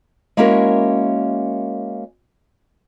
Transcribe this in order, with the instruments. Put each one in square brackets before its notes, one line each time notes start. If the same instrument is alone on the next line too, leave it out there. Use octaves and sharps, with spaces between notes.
[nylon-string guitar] G#3 A#3 C#4 E4 F#4 A#4